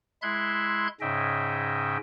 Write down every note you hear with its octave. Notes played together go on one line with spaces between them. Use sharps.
G#3 E4 E5 C6 F#6 G#6
G#2 C#3 C#4 D#5 E5 G5